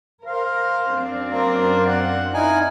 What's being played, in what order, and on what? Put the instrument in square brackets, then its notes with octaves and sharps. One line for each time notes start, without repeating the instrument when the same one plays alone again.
[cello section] A#4 [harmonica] C5 F5
[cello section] F#2 C4 D4
[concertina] A#3 [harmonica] A#4 C5
[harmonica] F#5
[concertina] D#4 G#5 [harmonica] E4 F5